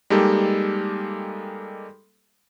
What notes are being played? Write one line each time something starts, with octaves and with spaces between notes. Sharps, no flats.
G3 G#3 A#3 D#4 G4 A4